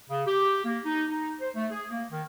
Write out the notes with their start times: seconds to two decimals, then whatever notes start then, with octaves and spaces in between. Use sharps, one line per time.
0.09 C#3
0.27 G4
0.64 A#3
0.86 D#4
1.10 D#4
1.41 C5
1.55 A3
1.70 G#4
1.90 A#3
2.11 D#3